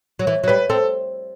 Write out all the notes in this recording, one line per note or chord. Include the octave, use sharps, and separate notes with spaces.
F#3
E3
F#3
G3 B4
C4 A4